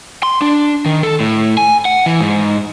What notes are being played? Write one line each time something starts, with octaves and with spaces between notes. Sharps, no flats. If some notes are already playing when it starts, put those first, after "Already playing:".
C6
D4
D#3
A4
A2
G#5
F#5
E3
G#2